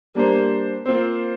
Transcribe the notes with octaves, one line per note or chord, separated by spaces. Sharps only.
G3 A#3 D4 G4 C5
A#3 C4 F4 C5